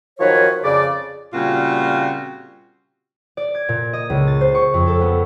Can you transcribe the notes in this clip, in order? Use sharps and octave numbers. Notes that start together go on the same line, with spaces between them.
D#3 F3 F#3 A#4 B4 C#5
F2 C#3 D5
A#2 C#3 G3 C4 F4 F#4
D5
G#6
A#2
D#5
C#2
A6
C5
C#6
F2
A4
B3